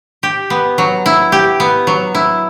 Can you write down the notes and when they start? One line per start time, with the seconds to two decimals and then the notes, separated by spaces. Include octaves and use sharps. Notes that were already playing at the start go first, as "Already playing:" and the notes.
0.23 G4
0.50 B3
0.78 F#3
1.06 E4
1.32 G4
1.60 B3
1.87 F#3
2.14 E4